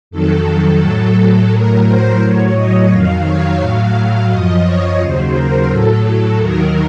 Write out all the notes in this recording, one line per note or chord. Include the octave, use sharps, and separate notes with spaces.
F2 D#3 F#3 A4
A2 F#3 A4
A2 F#3 A#4
C5
A2 F#3 C#5
D#5
F2 D#3 F#3 F5
C#5
A2 F#3 F5
F#2 F3 D#5
C#5
D#2 C#3 F#3 C5
A#4
A2 F#3 A4
D#2 D#3 F#3 A#4